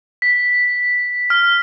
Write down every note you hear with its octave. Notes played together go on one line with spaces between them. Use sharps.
B6
F6